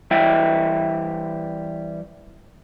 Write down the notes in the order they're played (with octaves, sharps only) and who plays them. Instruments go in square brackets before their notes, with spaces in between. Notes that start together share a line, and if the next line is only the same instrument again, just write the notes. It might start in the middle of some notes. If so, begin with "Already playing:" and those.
[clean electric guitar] E3 G3 E4 E5 G5